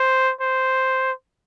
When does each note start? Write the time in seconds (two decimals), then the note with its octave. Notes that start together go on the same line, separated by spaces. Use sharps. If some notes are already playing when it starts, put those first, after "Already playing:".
Already playing: C5
0.41 C5